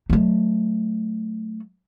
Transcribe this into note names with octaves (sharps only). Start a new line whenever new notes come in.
F#3 A3